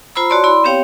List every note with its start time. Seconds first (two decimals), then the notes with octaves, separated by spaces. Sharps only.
0.16 F4 C5 A#5 B5 E6
0.30 F#4 C#5 D5 A5 C6
0.44 E4 D5 B5 C6
0.64 B3 C4 G4 C#5 F5 G5